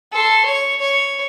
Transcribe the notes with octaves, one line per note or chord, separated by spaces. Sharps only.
A4 C6
C#5
C#5